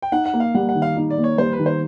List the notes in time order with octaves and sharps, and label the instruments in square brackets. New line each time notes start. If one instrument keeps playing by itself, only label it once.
[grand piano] G5
[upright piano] D#4 [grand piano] F#5
[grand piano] F#5
[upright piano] A#3
[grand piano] F5
[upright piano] G3 [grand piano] F#5
[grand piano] F#5
[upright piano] D#3
[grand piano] F5
[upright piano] D#4
[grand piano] D5
[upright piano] A#3
[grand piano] C#5
[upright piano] G3 [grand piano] C5
[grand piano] B4
[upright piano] D#3
[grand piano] C5